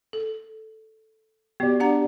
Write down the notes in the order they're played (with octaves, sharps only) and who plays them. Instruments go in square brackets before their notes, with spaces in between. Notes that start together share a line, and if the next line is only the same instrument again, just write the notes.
[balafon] A4
[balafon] B3 F#4 [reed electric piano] G4 D5
[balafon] D4 F#5 A#5